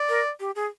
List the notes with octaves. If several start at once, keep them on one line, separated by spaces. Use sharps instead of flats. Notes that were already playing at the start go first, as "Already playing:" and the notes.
Already playing: D5
A#4
G4
G#4